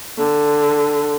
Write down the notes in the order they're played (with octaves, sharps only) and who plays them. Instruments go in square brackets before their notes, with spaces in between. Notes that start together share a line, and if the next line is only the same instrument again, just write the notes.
[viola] D3